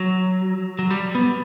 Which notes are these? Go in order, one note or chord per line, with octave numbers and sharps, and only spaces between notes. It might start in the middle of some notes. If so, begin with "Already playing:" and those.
Already playing: F#3
F#3
G3
B3